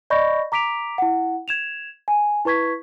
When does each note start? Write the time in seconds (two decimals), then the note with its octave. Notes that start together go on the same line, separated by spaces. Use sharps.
0.10 D5 D#5 B5 C#6 G6 A#6
0.52 A#5 D6 B6 D7 F7
0.98 E4 F#5
1.48 G#6 E7 F7
2.08 G#5
2.45 E4 B4 C#6 G#6 B6